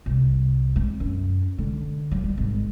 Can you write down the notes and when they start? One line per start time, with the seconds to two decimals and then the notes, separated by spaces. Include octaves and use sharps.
0.06 C2
0.76 C4
1.00 F#2
1.58 D3
2.11 F#3
2.24 G3
2.38 G#1